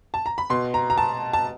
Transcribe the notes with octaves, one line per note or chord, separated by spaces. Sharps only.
A5
A#5
B5
B2 C6
A#5
A#5
A5
A5